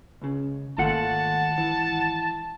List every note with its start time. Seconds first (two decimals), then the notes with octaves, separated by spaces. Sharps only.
0.22 C#2 C#3
0.78 G#1 A#2 A3 F4 F#5 A5
1.58 E3